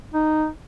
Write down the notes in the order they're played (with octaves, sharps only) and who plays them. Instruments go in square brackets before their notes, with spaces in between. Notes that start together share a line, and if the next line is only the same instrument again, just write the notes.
[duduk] D#4